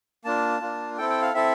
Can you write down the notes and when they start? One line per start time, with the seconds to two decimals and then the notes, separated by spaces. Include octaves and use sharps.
0.25 A#3 D4 F4 A5
0.61 A#3 D4 F4
0.98 C4 E4 A4 G5
1.10 G5
1.22 F5
1.34 C4 E4 A4 E5